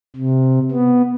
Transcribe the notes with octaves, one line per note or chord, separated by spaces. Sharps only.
C3
B3